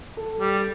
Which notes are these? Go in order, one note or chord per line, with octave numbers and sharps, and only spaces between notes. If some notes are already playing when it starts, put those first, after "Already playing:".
A4
G3